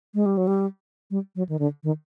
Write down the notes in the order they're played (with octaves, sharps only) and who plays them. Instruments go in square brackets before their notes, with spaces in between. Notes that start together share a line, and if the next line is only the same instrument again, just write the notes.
[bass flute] G#3
G3
F#3
G3
G3
F#3
D#3
D3
D#3